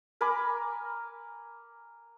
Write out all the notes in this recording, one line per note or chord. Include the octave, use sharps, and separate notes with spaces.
A#4 G#5 B5 D6